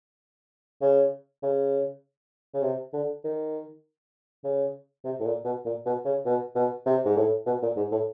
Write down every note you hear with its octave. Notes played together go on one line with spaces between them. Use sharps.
C#3
C#3
C#3
C3
D3
D#3
C#3
C3
A2
A#2
B2
A#2
B2
C#3
B2
B2
C3
G#2
A2
B2
A#2
G#2
A2